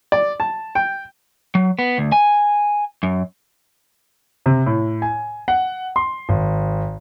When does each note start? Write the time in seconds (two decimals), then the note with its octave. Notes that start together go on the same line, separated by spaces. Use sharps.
0.12 D5
0.40 A5
0.75 G5
1.55 F#3
1.79 B3
1.98 D2
2.12 G#5
3.03 F#2
4.46 C3
4.66 A2
5.02 G#5
5.48 F#5
5.96 C6
6.29 G#1